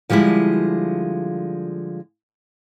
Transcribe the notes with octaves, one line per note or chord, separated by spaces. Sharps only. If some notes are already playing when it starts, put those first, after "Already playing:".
D3 F3 G3 G#3 E4